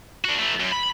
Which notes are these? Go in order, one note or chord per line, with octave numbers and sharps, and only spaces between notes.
D4 F#4
E3 A3
F#2
B5